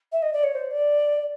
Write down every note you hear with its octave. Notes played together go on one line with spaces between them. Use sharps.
E5
D#5
D5
C#5
C5
D5
D5